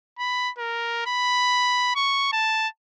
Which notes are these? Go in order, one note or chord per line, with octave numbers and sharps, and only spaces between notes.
B5
A#4
B5
C#6
A5